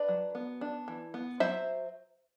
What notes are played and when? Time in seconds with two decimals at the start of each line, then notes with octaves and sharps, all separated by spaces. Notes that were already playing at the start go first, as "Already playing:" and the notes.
Already playing: D4 B4 D5
0.09 F#3
0.35 B3
0.61 D4
0.88 E3
1.14 B3
1.40 F#3 C5 E5